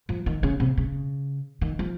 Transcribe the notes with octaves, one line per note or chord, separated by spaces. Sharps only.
F3
D#3
C#3
C3
C#3
D#3
F3